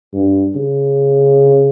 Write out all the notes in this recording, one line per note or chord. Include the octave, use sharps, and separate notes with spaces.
G2
C#3